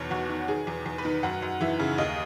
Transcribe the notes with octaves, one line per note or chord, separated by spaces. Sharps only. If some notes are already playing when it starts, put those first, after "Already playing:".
Already playing: E2 B2 D#3 C#5
E2 F#4
D#3
D#3 G#4
E2
E2
B4
D#3
F#2 F#5
F#2
E3 E5
C#3
D#2 D#5